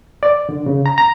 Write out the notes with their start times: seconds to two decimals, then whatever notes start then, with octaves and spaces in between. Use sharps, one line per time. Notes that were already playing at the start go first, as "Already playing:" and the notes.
0.23 D5
0.49 D3
0.66 C#3
0.86 A#5
0.98 A#5